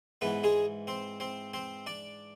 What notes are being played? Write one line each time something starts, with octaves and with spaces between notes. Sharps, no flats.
G#2 E3 B3 B4
G#3 G#4
C4 C5
C4 C5
C4 C5
D4 D5